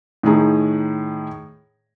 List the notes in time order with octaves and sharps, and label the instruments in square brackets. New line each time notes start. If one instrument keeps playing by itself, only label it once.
[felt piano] A2 D#3 G#4 A#5